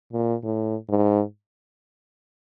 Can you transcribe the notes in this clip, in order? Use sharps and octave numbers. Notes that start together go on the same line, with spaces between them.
A#2
A2
G#2